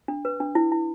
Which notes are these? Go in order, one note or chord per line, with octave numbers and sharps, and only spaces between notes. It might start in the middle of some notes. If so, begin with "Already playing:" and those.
D4
B4
D4
E4
E4